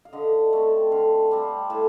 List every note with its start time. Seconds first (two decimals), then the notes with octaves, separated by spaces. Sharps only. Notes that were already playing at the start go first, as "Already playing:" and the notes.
0.05 F5
0.13 D3 D#5
0.53 A3 C4
0.92 D3 F5
1.31 G3 C4
1.70 A2 A5